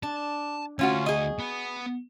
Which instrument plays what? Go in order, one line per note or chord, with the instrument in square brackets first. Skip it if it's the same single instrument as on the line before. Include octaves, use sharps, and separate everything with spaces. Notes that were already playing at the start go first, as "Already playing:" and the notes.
[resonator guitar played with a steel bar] D4 [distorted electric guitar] A5
[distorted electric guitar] D2 [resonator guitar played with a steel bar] C#4 F4 F#4
[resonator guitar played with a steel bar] G#4 D#5
[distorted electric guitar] B3